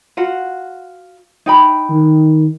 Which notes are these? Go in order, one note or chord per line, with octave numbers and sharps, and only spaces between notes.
F4 F#4 F#5
D#4 G5 B5
D#3